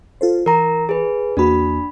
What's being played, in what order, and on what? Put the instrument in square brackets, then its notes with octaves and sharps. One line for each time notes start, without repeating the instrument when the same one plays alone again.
[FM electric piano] F4 A4 C5
[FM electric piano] E3 [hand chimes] A#4 A#5
[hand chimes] G#4 B4
[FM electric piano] E2 A#3 F#4 [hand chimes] D4 B5